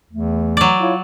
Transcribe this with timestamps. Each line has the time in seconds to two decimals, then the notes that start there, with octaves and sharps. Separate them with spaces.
0.12 E2 E3 A3
0.57 F#3 D5
0.80 E4 F4 C#5